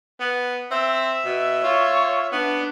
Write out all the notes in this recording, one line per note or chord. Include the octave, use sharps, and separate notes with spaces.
B3
C4 E5
B2
F4 C#5
B3 D4